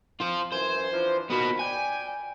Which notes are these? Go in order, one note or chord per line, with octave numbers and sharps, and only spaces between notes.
C4 F4 C5
F#2 E3 C5 G#5
E3 F3 D4
A#2 D#3 B3 F#4 B5
D5 G5 G#5